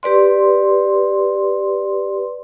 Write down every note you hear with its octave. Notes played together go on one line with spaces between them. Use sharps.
G4 B4 D5 C6